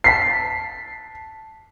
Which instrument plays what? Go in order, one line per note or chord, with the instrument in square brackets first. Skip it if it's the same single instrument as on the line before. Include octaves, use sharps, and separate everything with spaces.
[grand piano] A5 B6 C7